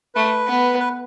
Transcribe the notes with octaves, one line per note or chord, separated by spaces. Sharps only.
A3 B4
B3
B4